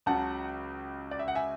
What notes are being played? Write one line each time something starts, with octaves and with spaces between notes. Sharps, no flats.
C#2 C#3 F#3 F#5 A5
D5
E5
F#5
E5 G#5